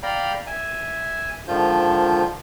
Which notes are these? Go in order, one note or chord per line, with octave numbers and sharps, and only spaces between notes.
D5 F5 G5 A#5 B5
E5 G#5
G#2 D3 D#3 F3 F4 G6